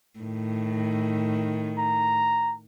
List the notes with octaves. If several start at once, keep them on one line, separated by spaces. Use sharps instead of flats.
A2 D#3
A#5